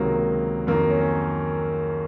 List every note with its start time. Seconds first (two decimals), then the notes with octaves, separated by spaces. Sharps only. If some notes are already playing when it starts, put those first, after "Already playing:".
Already playing: C#2 C3 D#3 F#3 A#3
0.67 F2 D#3 F#3 A#3
0.90 C#4
1.01 C#4